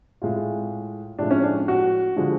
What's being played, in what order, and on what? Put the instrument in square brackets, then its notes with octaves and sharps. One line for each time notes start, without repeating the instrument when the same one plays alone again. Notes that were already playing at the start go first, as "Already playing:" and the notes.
[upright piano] A2 G#3 F4
A2 F3 G#3 D4
C#4
D4
F#4
D3 F3 G#3